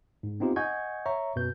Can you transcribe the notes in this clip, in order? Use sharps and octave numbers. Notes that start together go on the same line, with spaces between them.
G#2
B3 C4 D#4 F4 G4
D#5 F#5 G#5 C#6 G6 G#6
C#5 E5 A#5 C#6
F#2 B2 B4 G6